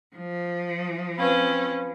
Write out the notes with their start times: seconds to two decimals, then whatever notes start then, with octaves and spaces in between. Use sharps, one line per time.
0.16 F3
1.18 C4 C#4 B4 F5 B5